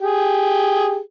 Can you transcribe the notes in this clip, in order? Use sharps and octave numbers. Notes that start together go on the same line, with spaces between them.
G4 G#4